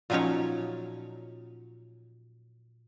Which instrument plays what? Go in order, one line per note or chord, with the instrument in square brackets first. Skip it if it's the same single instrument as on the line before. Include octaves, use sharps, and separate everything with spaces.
[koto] A#2 F3 F#3 C#4 D#4 C#5